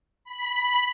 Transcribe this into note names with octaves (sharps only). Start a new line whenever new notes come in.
B5